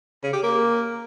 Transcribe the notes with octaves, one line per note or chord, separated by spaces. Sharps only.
C#3
G4
A#3